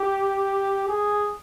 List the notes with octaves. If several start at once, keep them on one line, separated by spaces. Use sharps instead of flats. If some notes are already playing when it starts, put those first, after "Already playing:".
Already playing: G4
G#4